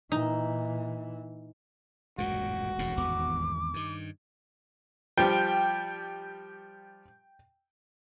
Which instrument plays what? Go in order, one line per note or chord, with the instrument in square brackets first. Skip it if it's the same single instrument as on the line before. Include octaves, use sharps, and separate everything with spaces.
[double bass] A#2 E3 [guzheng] D#4
[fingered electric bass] D#1 A1 G#3 [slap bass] F#2 A#2 [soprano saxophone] F#4
[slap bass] E1 F#2 A2
[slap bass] G#1 E2 B3 [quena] D6
[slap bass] G2 D#3
[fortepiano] F3 G3 [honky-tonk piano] G5